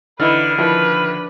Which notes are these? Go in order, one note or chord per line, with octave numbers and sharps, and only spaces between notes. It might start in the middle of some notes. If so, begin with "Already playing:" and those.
D3 E3 D#4 E4 B4 F6
D#3 F3 E4 B4